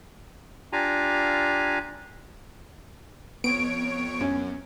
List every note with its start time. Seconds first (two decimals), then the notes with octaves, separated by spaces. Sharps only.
0.73 D4 F4 G4 F5 G#5 A#5
3.44 F2 B3 C#5 D7
4.21 F#2 C#4